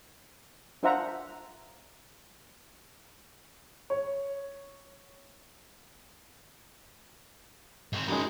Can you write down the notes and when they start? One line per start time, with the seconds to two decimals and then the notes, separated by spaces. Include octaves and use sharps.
0.83 D4 F4 C5 E5 F#5 A#5
3.90 C#5
7.93 G#2 C4
8.08 F#2 F#3 G#3 D#4 B5